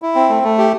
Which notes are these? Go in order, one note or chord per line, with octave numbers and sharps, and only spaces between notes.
E4
C4
A3
A3
G4